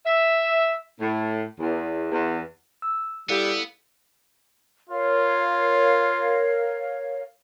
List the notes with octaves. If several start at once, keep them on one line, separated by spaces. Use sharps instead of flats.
E5
A2
E2
E2
E6
G3 B3 E4 A4 F5
F4 A#4 C#5 F5